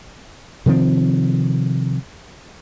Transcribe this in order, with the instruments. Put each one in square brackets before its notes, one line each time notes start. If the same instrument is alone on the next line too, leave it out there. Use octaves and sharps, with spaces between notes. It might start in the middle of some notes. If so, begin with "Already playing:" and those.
[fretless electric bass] C3 D#3 F3 C4